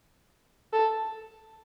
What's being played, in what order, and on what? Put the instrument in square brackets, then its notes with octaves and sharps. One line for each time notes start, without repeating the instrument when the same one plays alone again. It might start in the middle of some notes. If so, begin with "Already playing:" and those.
[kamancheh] A4